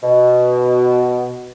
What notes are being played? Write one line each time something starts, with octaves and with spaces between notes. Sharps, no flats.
B2